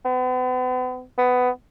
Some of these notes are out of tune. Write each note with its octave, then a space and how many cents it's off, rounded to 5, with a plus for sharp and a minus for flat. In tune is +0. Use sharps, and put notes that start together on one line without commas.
B3 +40
B3 +15